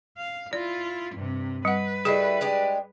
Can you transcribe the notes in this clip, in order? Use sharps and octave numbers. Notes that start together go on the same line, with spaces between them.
F5
E4 F4 D5
G2 C3
G3 B4 F#5
G3 A3 E4 G#4 D#5
G#3 D4 G4